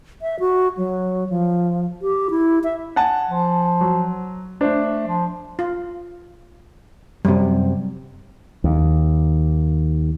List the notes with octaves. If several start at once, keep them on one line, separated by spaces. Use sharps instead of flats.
E5
F#4
F#3
F3
G4
E4
E5
F#5 G#5 A5
F3
F#3
A3 D4 C5
F3
F4
F#2 C3 G3
D#2